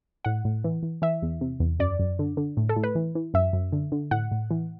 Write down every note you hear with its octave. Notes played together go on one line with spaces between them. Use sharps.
A2 F#5
A2
E3
E3
E3 E5
E2
C3
E2
F#2 D5
F#2
D3
D3
A2
A4
A2
B4
E3
E3
F#2 E5
F#2
D3
D3
A2 F#5
A2
E3